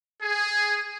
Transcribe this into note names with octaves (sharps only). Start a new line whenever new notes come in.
G#4